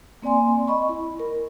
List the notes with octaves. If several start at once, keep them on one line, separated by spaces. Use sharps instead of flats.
A#3 C4 D5 G#5 C6
D#5 B5 C#6
E4
A#4